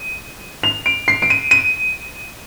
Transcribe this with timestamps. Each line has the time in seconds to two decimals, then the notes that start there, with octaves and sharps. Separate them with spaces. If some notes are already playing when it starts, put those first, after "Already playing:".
Already playing: D#7
0.63 F7
0.86 D7
1.08 C7
1.22 D7
1.30 D#7
1.51 D#7